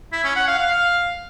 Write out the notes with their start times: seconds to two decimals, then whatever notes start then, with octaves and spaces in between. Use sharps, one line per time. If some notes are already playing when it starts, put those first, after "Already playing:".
0.12 E4
0.24 C#4
0.36 F#5
0.48 F5
0.59 F5